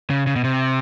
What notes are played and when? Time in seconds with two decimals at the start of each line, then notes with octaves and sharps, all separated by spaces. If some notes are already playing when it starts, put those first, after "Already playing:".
0.10 C#3
0.27 C#3
0.36 B2
0.44 C3